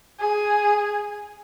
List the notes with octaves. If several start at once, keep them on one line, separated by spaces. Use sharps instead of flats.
G#4